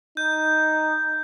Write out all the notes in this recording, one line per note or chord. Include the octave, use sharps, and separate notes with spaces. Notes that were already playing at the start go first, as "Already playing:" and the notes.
D#4 G6